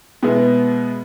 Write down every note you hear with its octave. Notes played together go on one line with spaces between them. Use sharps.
B2 G#3 B3 E4